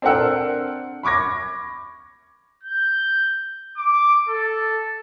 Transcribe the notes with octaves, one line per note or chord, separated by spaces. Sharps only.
C4 D4 A4 A#4 F#5 E6
B5 C#6 D6 G#6 A#6
G6
D6
A4